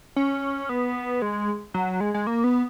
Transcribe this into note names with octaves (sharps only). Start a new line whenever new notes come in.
C#4
B3
G#3
F#3
G#3
G#3
A#3
B3